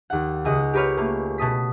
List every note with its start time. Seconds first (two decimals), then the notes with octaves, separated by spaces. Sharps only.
0.10 D#2 F#5
0.45 C#2 D#5 F#6
0.73 G4 A#4 B4 C#5 F6
0.97 A3 A#3
1.38 B2 A5 D#6 B6